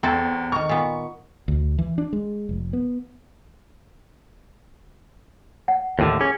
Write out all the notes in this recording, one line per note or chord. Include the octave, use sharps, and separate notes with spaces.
E2 C4 F#4 A4
D#3 A#4 C#6
A#2 B3
D2
E3
D4
G#3
F1
B3
F#5
D#2 A2 D3
C#4 G#4